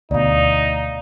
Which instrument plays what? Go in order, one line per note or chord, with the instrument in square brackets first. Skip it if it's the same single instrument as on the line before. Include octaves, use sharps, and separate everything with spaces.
[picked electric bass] D2 B2 [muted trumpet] D#4 [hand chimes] D5 F5